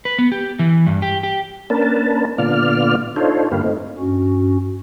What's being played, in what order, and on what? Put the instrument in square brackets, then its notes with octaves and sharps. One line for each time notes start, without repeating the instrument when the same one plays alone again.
[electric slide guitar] B4
B3
G4
E3
G2
G4
G4
[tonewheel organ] A#3 C#4 D4 A#4 B4 A5
A#2 D3 B3 F4 D5 F6
D4 D#4 F4 A4 C5 C#5
G2 D3 A#3 G4 B4 F5
A3 C4 D#4
[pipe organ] G2 C#4 F#4